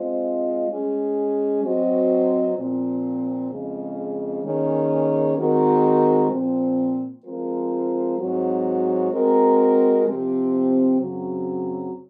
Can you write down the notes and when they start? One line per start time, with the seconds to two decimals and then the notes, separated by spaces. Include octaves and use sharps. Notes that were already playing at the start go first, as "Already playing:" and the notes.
Already playing: G#3 C4 F4 C5 D#5
0.69 G#3 C#4 G#4
1.64 F#3 C4 F#4 C5 D#5
2.57 A#2 F3 C4
3.50 F2 C#3 G#3
4.44 D#3 A#3 C#4 G#4 C#5
5.37 D#3 G#3 C4 F#4 A#4
6.32 A#2 F3 C4
7.25 F3 G#3 C4 F4 A#4
8.19 G#2 F#3 C4 F#4 C#5
9.12 G#3 C4 F#4 A#4
10.07 C3 F3 C4
11.00 F#2 C#3 F#3 C4 F#4